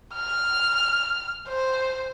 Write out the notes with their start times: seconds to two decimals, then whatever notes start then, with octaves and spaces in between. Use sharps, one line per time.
0.15 F6
1.48 C5